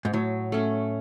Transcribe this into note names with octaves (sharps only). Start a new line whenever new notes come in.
G#2
A2 F#3
A3 C#4